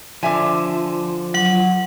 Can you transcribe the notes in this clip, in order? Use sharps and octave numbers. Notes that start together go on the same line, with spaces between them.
D3 F3 E5 G#5
F#3 F#5